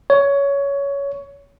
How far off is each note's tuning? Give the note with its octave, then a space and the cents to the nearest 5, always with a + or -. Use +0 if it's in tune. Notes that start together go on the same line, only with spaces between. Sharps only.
C#5 +15